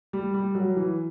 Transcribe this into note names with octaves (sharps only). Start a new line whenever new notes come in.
G3
G3
F#3
E3